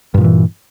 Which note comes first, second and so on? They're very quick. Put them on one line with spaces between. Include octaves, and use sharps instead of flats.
G2 A#2 F3 E3